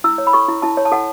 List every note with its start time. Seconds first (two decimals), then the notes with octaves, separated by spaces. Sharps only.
0.04 E4 E6
0.18 C#5
0.27 B5
0.33 A4 C#6
0.48 E4
0.62 E4 A5
0.77 C#5
0.85 A5
0.92 A4 F#5